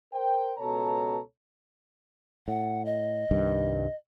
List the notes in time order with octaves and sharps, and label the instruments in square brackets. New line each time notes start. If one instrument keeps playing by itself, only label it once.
[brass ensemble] A#4 C5 G5
C#2 B2 A4 C#5 A5 A#5
[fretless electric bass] A2 [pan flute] F#5
[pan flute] D#5
[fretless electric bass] C2 G2 D#3